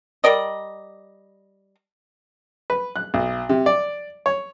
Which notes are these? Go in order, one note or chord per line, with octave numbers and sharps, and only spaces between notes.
G3 A#4 D5 D#5
B4
F#6
B1
C3
D5
C#5